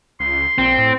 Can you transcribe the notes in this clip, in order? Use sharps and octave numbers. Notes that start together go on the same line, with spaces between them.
C#2 C6
A#1 C4
A2